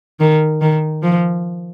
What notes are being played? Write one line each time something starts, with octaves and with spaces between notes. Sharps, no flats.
D#3
D#3
F3